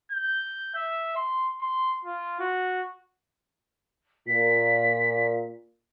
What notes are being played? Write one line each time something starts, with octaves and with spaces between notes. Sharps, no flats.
G6
E5
C6
C6
F4
F#4
A#2 B6